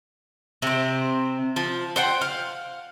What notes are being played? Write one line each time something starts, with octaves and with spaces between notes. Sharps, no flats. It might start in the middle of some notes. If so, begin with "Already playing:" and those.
C3 C4
F3
C5 F#5 G5
F5